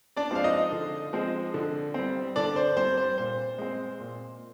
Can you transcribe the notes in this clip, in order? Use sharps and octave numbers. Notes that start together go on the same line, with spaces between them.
D4 D5
F3 G#3 C4 F5
D#4 D#5
D3
F3 G#3 C4
D3
G3 C4
D3 D4 D5
C5
G3 C4 C5
C5
A#2 C5
G#3 C4
A#2